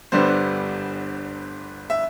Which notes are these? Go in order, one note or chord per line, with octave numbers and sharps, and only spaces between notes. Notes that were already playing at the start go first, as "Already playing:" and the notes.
G1 G2 D3 G3 B3 C5
E5